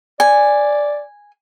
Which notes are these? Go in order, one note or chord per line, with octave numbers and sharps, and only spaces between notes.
D5 G#5